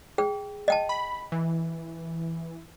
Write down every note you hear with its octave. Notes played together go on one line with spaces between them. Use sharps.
G#4 G5
D#5 G5 A5
B5
E3